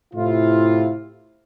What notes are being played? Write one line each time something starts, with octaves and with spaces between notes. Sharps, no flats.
A2 C3 E4 F4